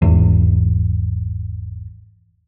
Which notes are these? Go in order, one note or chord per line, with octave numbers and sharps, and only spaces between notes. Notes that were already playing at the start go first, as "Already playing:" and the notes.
G#1 E2